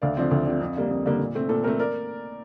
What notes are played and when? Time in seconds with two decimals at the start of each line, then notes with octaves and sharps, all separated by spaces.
0.02 D2 D5 F5
0.17 D3 F3 C4
0.31 D2
0.46 D3 F3 C4
0.61 F2
0.76 D3 G3 A#3
0.91 F2
1.06 D3 G3 A#3
1.19 A#2
1.35 A3 C4
1.49 A#2 A4
1.64 A3 C4 A#4
1.79 A#4 D5